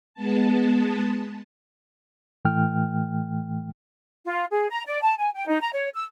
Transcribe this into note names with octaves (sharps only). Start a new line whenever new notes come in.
G#3 B3 A5
A2 E3 A3 G5 F6
F4
G#4
A#5
D5
A5
G#5
G5
D#4
A#5
C#5
E6